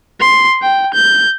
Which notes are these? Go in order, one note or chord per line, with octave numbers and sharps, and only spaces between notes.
C6
G5
G6